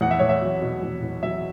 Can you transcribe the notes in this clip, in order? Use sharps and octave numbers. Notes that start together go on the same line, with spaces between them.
E2 F#5
E5
E2 C#5
E5
F#3
B2
E2
E2
F#3 E5